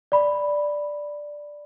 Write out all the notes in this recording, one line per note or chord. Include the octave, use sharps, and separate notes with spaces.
D5 B5